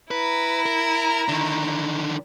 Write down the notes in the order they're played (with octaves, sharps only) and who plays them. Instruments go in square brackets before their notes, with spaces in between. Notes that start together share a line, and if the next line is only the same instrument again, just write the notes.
[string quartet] E4 A#5 [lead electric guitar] B4
[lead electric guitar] A#4
D3 D#3